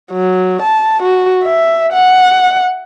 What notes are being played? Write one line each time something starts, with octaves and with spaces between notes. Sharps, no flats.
F#3
A5
F#4
E5
F#5